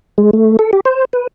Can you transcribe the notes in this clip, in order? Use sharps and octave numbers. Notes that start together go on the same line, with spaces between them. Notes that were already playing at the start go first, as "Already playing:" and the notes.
G#3
A3
A4
G4
C5
B4